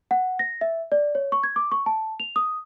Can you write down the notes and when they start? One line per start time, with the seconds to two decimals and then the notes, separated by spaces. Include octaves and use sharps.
0.11 F#5
0.39 A#6
0.61 E5
0.92 D5
1.15 C#5
1.32 C#6
1.44 G#6
1.56 D6
1.72 C#6
1.86 A5
2.20 F7
2.36 D#6